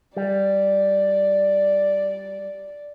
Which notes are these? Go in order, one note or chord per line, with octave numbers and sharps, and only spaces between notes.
G3 D5